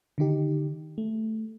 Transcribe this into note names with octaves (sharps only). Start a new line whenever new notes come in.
D3 D#3 D#4 G4
A3